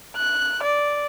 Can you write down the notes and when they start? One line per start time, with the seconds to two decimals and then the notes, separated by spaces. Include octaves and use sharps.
0.16 F#6
0.63 D5